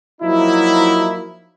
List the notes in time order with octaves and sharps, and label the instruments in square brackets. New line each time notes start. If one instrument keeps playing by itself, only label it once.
[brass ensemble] F3 F#3 A#3 D#4 E4